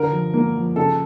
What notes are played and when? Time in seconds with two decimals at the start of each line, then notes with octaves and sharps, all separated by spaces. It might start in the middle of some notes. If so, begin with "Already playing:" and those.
Already playing: D3 A#4
0.11 F3
0.34 A#3
0.55 F3
0.76 C#3 A4